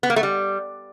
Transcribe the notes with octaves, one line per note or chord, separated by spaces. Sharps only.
B3
A#3
A3
G3